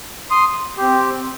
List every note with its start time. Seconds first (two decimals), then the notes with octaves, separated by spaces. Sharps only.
0.30 C6 D#6
0.77 C4 G4